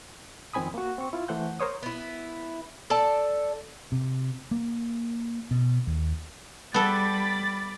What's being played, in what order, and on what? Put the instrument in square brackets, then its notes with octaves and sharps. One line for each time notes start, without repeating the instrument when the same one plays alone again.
[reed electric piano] F2 D#3 C4 G#5 B5 D#6
A#3 F#4
C4 C#6
E4 F4
E3 A3 C5 F#5 G6
A#4 C5 C#5 D#6
[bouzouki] B3 E4
A4 D5 A5
[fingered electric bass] C3
A#3
B2
D#2
[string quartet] G3 [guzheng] B3 A4 [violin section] B5 D6 A6